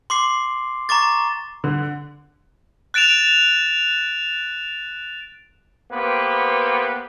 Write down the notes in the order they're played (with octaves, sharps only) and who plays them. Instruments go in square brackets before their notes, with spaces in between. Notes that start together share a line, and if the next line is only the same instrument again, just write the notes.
[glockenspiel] C6 D6 C7
A#5 C#6 D6 A6
[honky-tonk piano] D3
[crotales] F#6 A6 D7 E7 F7
[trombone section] A#3 B3 G4 B4 C5